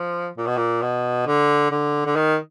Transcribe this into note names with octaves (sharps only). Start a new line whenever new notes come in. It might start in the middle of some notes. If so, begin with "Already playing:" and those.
Already playing: F3
A#2
B2
A#2
B2
D3
D3
D3
D#3